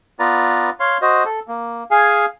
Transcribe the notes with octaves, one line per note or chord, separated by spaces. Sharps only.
B3 F4 B4 D5 A#5
C#5 F5 C6
F#4 C5 D#5
A4
A#3
G#4 F5 G#5